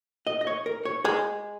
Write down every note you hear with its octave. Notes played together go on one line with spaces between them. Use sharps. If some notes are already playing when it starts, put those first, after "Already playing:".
D#5
D#5
C#5
A#4
C#5
G#3 G#4